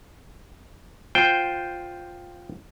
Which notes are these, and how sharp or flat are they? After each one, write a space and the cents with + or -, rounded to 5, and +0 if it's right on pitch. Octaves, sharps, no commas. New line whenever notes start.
F4 +10 C5 +0 G5 +0